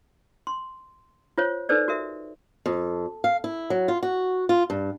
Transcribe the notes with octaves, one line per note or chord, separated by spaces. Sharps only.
C6
F4 C5 C#5
D#4 A4 B4 C5 D5
F#4 A#4 E5
F2
F5
E4
F#3
F4
F#4
F4
G2